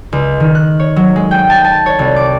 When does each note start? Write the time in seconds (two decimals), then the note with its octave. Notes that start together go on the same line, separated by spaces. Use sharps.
0.13 C#2
0.40 D#3
0.55 F#6
0.80 C#5
0.96 F#3
1.16 G#3
1.31 G5
1.50 A5
1.64 A5
1.86 C#5
1.99 C2
2.16 D6